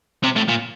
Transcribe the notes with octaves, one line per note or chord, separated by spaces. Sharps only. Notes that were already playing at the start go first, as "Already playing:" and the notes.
C3
A2
A#2